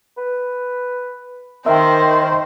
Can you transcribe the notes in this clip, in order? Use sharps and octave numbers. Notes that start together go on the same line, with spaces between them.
B4
D#3 A#4 C5 E5 G5